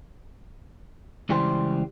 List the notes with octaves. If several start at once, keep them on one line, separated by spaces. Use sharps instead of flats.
C#2 E3 G3 G4 C5 G5